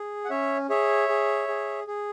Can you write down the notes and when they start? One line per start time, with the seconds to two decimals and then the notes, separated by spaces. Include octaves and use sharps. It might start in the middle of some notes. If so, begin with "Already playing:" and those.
Already playing: G#4
0.25 F#5
0.30 C#4 C#5 E5
0.70 G#4 C#5 E5
1.09 G#4
1.48 G#4
1.87 G#4